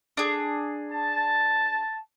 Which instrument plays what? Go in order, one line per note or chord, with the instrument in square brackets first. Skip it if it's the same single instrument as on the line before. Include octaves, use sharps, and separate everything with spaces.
[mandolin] D4 G#4
[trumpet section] A5